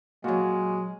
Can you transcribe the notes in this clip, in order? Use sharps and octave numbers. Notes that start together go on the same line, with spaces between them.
A#2 F#3 G#3 F#4 F5